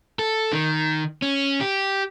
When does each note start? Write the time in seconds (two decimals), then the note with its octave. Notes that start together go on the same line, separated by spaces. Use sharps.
0.19 A4
0.52 D#3
1.22 C#4
1.61 G4